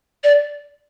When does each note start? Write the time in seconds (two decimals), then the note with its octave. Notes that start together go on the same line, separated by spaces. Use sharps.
0.24 D5